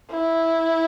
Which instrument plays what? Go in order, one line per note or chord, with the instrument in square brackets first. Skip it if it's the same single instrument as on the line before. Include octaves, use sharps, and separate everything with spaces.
[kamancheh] E4